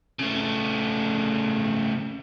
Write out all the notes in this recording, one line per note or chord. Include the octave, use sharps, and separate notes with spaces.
C#3 A3